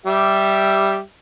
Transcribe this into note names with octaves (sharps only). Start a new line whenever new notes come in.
G3 G4 E5